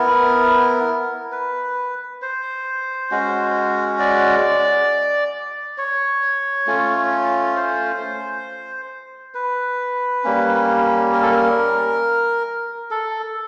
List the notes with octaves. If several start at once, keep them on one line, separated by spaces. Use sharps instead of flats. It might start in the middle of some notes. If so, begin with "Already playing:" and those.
Already playing: B3 E4 A#4
B4
C5
G#3 C#4 F#4
D5
C#5
A3 C#4 F4
C5
B4
G3 A#3 C#4
A#4
A4
A#4
A4